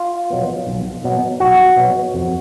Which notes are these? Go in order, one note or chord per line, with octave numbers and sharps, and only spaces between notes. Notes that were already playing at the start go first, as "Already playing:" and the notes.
Already playing: F4
B2 F#3 B3
B1
B2 F#3 B3
B1 F#4
B2 F#3 B3
F2